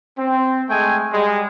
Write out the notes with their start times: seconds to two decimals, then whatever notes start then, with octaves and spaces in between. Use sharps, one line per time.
0.18 C4
0.70 G#3 A3 G5 G#5
1.12 G3 G#3